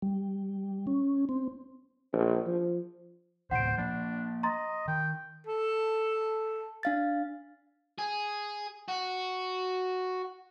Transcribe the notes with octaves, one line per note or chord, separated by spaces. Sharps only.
G3
C#4
C4
A#1
F3
D2 A2 C3 C5 F#5 D7
F3 A#3 D4
D#5 A#5 C6 A6
D#3 G5
A4
D4 F5 A6
G#4
F#4